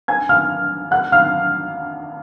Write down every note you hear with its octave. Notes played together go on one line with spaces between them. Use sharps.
G#5 G#6
F5 F6
F#5 F#6
F5 F6